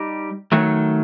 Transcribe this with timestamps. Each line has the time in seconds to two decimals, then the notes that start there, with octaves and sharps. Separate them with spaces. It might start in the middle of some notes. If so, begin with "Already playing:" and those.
Already playing: G3 D#4 G4
0.52 D#3 F#3 A3